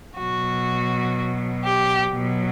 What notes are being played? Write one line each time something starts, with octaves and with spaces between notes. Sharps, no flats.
B2 F#3 F#4
G4
B2 F#3